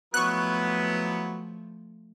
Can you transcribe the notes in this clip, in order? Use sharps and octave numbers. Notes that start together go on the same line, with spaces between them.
F3 F#3 A3 B3 E4 B4 C#6 F#6